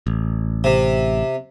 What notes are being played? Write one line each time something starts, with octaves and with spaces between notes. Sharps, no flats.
A1
C3